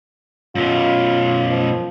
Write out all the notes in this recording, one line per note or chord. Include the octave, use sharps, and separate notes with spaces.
F#2 B2 F4
F3